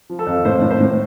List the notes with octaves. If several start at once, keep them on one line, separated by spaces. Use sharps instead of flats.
F3
A4
F2
A2 C5
A2
C5
A2